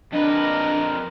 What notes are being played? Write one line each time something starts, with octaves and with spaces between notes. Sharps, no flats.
F2 D4 A#4 B4 D#5 A#5